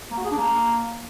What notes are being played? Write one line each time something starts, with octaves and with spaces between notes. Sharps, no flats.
A#3
F#4
G#4
D4
A#3